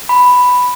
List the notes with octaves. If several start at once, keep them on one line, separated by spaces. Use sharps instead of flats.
B5